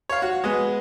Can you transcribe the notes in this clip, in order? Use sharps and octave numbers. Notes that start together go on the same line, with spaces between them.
C#5 F5
F#4
G#3 B3